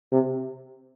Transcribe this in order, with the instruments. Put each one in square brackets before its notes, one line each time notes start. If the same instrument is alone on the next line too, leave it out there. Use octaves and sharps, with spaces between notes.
[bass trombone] C3